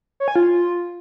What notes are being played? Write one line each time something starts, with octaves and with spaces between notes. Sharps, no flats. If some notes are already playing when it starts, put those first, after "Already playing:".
C#5
G#5
F4